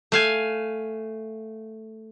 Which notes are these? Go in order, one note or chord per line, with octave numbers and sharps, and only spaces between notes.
A3 F5 G#5